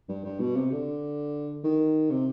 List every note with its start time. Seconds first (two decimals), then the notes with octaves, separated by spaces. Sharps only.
0.09 G2
0.24 G2
0.39 B2
0.56 C3
0.71 D3
1.64 D#3
2.10 C3